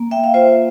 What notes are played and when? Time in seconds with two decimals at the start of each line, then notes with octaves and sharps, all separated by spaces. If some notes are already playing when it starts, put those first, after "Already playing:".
Already playing: A#3
0.11 E5 G5
0.24 F5
0.34 F4 C5 E5